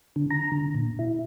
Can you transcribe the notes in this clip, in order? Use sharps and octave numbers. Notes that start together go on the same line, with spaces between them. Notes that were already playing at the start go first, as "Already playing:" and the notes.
D3
A#5
D3
A#2
E4